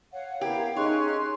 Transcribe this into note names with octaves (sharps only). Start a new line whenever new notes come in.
C#5 F5 F#5
B3 E4 G4 A#4 F5 G#6
C#4 D#4 G#4 C#5 C6 F#6